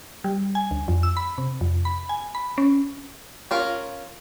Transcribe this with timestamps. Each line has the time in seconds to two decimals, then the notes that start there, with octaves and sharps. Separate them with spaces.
0.24 G3
0.55 G#5
0.71 D2
0.88 F2
1.03 E6
1.17 B5
1.38 C3
1.61 F2
1.85 B5
2.09 G#5
2.35 B5
2.58 C#4
3.51 C#4 F4 A#4